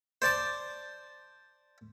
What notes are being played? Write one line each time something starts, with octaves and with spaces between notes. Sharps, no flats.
C5 D5 A5 D6